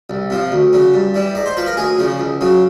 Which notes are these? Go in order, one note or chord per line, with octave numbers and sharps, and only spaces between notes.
C2
C3 F3
D2
C#3 F#3
G2
E3 G3
G#2 D5
C5
F3 B4
A#4
D2 G#4
C#3 F3
C#2
C#3 F#3